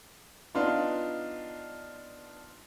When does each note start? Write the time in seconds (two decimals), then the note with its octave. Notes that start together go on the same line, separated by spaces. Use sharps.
0.54 B3 D4 D#4 F4